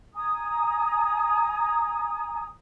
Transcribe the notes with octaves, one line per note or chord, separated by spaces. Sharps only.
G#5 A#5 D#6